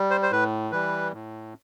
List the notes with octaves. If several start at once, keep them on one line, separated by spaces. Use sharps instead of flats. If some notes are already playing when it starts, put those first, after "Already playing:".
Already playing: G3
C5
C5
A2 B4
E3 G3 B4
A2